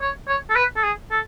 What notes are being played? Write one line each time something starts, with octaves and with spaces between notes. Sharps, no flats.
C#5
C#5
A4
B4
A4
G#4
A4